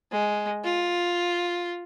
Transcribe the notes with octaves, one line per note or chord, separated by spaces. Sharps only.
G#3
F4